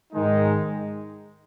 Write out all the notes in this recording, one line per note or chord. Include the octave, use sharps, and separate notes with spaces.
G#2 D#3 G#3 D#4